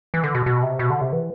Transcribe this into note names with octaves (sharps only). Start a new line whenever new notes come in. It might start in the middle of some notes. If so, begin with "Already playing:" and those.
E3
D3
B2
B2
C3
B2
D3
C3
E3